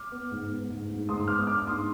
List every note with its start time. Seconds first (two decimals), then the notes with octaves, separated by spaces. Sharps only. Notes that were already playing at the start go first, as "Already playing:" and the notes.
Already playing: D6 F6
0.12 B3
0.31 G#2
0.51 B3
0.70 G#2
0.89 G#2
1.09 G#2 C6 D#6
1.28 B3 D6 F6
1.47 D4 D6 F6
1.67 G#2 C6 D#6